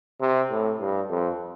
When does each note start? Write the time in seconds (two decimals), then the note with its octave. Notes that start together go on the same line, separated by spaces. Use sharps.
0.21 C3
0.51 A2
0.80 G2
1.09 F2